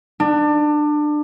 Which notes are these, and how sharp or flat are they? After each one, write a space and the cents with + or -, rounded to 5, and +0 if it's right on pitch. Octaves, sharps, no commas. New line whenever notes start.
D4 +25